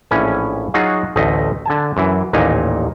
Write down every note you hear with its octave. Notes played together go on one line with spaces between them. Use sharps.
A#1 A2 E3 C#4 G#5
F#3 D#4 F4 F#4 G#4
A1 D2 A3 D#5
D3 G#5 A5
F#2 E3
A1 D#2 A#2 D#4 G#5 A#5